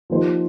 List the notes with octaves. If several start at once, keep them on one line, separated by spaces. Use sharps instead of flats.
F3 A#3 D#4 G4 C5